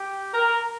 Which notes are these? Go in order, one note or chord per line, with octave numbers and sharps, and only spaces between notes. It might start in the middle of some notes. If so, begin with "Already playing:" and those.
Already playing: G4
A#4